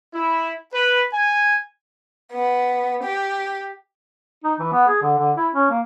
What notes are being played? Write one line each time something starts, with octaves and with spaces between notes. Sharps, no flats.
E4
B4
G#5
B3
G4
D#4
E3
B3
G#4
D3
D3
E4
C#4
A#3